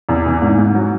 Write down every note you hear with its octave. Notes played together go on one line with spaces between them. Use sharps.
E2
E3
G#2
G#2
F#3